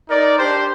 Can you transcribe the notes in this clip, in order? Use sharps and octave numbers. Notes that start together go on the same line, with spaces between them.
D#4 A#4 D5
D4 G4 C5